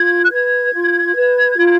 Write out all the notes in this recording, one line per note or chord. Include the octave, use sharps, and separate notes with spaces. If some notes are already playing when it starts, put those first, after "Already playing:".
Already playing: F4 G#6
F#6
B4 G#6
F4
B4
F4